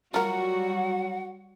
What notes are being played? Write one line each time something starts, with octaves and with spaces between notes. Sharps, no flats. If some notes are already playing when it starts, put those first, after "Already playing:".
F#3 G3 F4 F#4 A#4 F#5